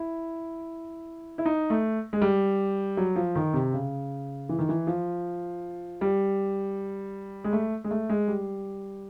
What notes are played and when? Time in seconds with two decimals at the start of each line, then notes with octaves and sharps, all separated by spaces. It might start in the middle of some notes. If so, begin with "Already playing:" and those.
Already playing: E4
1.38 E4
1.46 D#4
1.70 A3
2.13 G#3
2.22 G3
2.97 F#3
3.16 F3
3.35 D#3
3.53 C3
3.73 C#3
4.49 E3
4.59 D#3
4.69 E3
4.87 F3
6.01 G3
7.44 G#3
7.53 A3
7.84 G#3
7.91 A3
8.09 G#3
8.28 G3